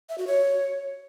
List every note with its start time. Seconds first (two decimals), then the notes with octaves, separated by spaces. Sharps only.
0.09 E5
0.18 F#4
0.27 C#5